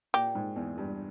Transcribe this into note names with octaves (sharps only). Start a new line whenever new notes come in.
A#2 G4
G#2
E2
G2